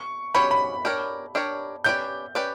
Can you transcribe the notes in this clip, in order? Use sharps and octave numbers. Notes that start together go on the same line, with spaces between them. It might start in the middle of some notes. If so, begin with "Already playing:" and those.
Already playing: C#6
F#3 C#4 G4 C#5 B5
B5
D4 G4 A#4 C#5
D4 G4 A#4 C#5
C#4 G4 B4 D5 G6
C#4 G4 B4 D5